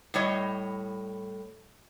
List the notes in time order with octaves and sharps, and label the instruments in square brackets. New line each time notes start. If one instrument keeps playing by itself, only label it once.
[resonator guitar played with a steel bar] A2 G3 C#5 D#5